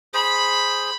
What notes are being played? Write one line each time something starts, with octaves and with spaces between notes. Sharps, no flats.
G#4 C5 B5